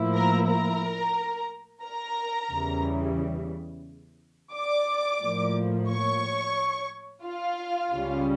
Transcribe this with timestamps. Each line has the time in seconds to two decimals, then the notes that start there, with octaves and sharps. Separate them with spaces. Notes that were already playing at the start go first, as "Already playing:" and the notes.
Already playing: A2 F3 A#3 E4
0.15 A#4 A#5
0.48 A#4 A#5
1.84 A#4 A#5
2.51 E2 C#3 E3 G3
4.54 D5 D6
5.22 A2 F3 A#3
5.90 C#5 C#6
7.25 F4 F5
7.92 C#2 C#3 G3 C#4